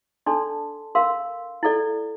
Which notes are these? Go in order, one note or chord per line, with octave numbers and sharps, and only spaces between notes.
D4 A4 D5 A5 C6
A#4 F5 C6
E4 A4 D5